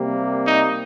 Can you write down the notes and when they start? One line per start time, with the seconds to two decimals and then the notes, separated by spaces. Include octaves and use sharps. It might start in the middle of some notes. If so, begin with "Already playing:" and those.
Already playing: C3 G3 A#3
0.45 D#4